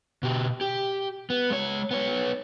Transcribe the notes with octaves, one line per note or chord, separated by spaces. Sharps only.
B2 G4
G4
B3
G#3 C#5
B3 C#5